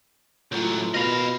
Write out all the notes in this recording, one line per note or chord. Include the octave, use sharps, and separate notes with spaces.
C#2 A2 F#3 F4
B2 A#4 D#5 F5 B5